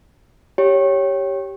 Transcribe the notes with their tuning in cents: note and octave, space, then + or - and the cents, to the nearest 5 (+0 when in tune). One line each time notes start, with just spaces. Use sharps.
G4 +0 C#5 +0